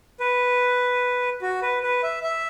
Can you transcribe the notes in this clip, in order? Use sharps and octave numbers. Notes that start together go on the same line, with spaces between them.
B4
F#4
B4
B4
E5
E5